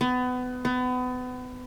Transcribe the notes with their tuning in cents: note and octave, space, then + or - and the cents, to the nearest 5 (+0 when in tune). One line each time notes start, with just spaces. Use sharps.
B3 +25
B3 +30